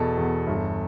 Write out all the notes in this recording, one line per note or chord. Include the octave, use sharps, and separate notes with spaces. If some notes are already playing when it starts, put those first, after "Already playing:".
Already playing: E2 B2 A4
E2
G1